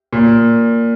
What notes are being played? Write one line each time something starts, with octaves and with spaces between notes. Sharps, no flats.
A#2